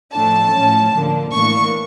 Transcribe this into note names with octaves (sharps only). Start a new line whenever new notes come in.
A2 F3 A3 D4 A5
A2 F3 C#4
D3 F3 A#3 D4
A2 E3 A#3 D4 C#6